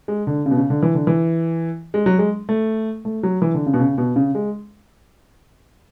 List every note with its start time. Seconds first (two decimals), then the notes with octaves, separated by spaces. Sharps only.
0.08 G#3
0.27 D3
0.46 C#3
0.51 B2
0.57 C#3
0.70 D3
0.82 E3
0.95 D3
1.07 E3
1.94 G#3
2.06 F#3
2.19 G#3
2.49 A3
3.05 A3
3.23 F#3
3.42 E3
3.54 D3
3.66 C#3
3.74 B2
3.80 C#3
3.98 B2
4.16 C#3
4.35 G#3